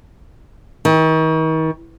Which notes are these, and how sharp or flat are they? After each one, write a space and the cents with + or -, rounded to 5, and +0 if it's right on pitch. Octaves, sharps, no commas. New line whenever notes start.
D#3 +40